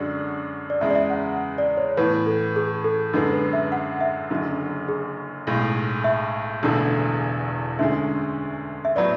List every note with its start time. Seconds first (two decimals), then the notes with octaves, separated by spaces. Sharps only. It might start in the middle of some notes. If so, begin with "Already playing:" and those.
Already playing: F#2 D3 G#3 D4 F#4 D5
0.70 D5
0.81 E2 C#3 G#3 E5
0.90 D5
0.95 E5
1.10 F#5
1.58 D5
1.77 C#5
1.97 A2 E3 B3 B4
2.27 A4
2.56 G#4
2.84 A4
3.13 F#2 D3 G#3 B3 A4
3.33 B4
3.53 E5
3.72 F#5
4.01 E5
4.30 F#1 F#2 D3 F#3
4.88 G#4
5.47 B1 A2 G#3
6.04 E5
6.63 E1 E2 D3 A3 E4
7.79 D2 D3 G#3 C#4 E5
8.85 E5
8.96 A2 F#3 B3 D5